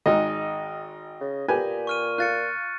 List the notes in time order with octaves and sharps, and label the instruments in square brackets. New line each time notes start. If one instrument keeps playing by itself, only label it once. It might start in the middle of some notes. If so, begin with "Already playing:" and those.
[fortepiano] G#1 G#3 D#4 [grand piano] D#5
[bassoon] C#3
[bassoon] A#2 [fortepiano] G4 B4 G#5
[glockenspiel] C#6 F6 D#7
[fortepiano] F4 [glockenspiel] F#6 A6 C#7